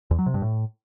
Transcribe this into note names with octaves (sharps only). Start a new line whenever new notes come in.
E2
F#3
C3
G2
A2